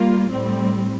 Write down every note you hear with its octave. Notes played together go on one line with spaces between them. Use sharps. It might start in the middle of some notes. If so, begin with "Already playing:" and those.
Already playing: G3 A#3 F4
A2 G3 C4